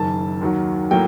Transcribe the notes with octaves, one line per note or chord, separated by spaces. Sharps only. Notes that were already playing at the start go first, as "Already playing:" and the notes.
Already playing: F#1 F#2 D#3 A5
D#2 D#3 F#3
A2 F#3 A#3 G5